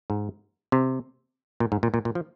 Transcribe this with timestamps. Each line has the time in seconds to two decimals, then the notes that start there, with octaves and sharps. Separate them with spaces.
0.10 G#2
0.72 C3
1.60 A#2
1.72 G#2
1.83 A#2
1.94 A#2
2.05 A#2
2.15 F3